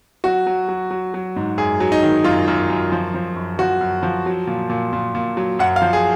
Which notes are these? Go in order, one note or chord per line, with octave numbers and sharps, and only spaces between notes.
F#3 F#4
F#3
F#3
F#3
F#3
G#2
F#2 G#4
F#3
D#4
D#3
F#2 F4
F#2
F#2
F3
F3
F#2
F3 F#4
F#2
F3
F#3
A#2
A#2
A#2
A#2
F#3
F#2 F#5
F5
F3
G#4